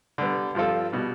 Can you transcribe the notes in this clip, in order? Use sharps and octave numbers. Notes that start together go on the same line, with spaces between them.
D3 G3 B3
G2 F3 C4 F4 A4
B2 G3